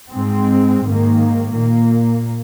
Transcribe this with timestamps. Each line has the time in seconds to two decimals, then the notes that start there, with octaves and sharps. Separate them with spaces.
0.12 G#2 G#3 C4
0.84 G#2 D#3 A#3
1.55 A#2 A#3